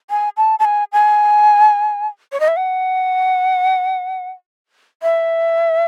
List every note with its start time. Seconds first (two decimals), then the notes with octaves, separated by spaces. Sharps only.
0.10 G#5
0.37 A5
0.59 A5
0.65 G#5
0.92 G#5
2.32 C#5
2.40 D#5
2.48 E5
2.57 F#5
5.03 E5